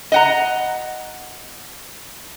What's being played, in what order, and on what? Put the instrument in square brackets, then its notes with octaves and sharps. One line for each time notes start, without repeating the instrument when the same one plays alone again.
[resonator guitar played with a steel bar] D#5 F#5 A#5